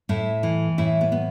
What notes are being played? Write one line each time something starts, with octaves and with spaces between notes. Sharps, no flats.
A2 E4
E3
A2 E4
B3
B3